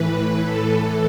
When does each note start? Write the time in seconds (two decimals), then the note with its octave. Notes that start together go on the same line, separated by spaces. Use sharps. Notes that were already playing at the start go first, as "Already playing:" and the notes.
Already playing: A2 E3 B4
0.46 A2 E3 A4